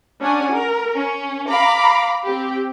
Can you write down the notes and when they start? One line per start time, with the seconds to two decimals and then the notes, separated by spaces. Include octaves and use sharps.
0.20 C#4 D4 F#5 G#5
0.52 A#4
0.96 C#4
1.49 F5 A#5 B5 D6
2.24 C4 G4